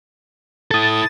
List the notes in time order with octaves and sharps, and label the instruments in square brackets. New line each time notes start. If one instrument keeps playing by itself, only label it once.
[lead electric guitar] E4 A4 [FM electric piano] D#6 A6